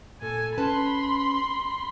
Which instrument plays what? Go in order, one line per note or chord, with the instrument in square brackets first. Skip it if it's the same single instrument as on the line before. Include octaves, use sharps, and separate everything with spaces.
[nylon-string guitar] A#2 [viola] A4 G#5
[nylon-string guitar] C#4 B4 A5 [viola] B5 C6